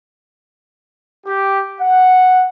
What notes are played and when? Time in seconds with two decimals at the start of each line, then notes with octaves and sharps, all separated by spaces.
1.27 G4
1.81 F#5